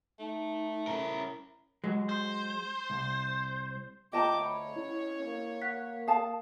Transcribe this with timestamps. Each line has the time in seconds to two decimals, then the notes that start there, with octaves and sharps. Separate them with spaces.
0.19 A3 D#4
0.87 C#4 E4 A#4
1.84 F#3 G#3
2.09 C5
2.90 C2
4.13 D2 F4 D#5 G5 A5 A#5 D6
4.45 C#5 B5
4.76 C#4 E4
5.22 A#3
5.62 F#5 F#6 B6
6.08 F5 A5 D#6